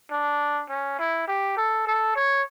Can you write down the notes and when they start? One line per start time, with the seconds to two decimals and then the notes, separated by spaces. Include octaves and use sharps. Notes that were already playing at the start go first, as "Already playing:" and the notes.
0.11 D4
0.69 C#4
0.99 E4
1.28 G4
1.57 A4
1.87 A4
2.16 C#5